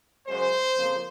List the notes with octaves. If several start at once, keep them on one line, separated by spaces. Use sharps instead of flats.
F#2 C#3 G#3 C5
F2 C#3 F3 A#3